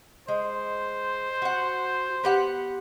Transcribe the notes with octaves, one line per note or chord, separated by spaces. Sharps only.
G#3 C5
F#4 F#5
B3 G4 F#5